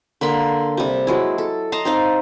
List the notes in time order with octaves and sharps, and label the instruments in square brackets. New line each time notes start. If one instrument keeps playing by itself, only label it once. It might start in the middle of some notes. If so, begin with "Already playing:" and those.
[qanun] D3 A#3 B5 C6
C3 G3
F#3 G#3 E4
A4
D#5 A5 A#5 C6
C4 D#4 F5